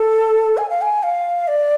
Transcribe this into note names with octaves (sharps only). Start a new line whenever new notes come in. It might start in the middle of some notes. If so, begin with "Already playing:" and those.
Already playing: A4
G#5
F5
G#5
F5
D5